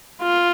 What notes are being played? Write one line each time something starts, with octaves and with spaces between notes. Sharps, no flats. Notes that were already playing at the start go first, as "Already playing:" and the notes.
F4